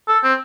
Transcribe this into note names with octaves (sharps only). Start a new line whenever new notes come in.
A4
C4